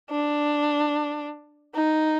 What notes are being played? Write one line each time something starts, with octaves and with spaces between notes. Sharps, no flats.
D4
D#4